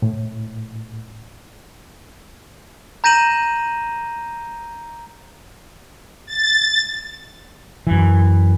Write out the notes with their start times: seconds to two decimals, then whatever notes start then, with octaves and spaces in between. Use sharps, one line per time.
0.02 A2
3.04 A#5 G6 A#6 D#7 E7 F#7
6.26 A6
7.87 F#2 E3